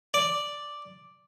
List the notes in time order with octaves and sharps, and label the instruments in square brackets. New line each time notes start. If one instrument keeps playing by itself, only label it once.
[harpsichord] D5